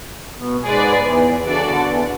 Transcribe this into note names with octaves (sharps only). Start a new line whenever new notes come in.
B2 B3
G#2 G#3 G#4 B4 D5
E2 E3
C#3 D4 F#4 A4 D5
D3
E2 E3